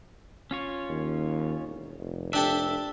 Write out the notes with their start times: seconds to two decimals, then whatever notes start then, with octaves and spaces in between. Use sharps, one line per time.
0.51 C#4 F4 C#5
0.89 D#2
1.64 E1
1.99 F1
2.33 D4 G4 A4 E5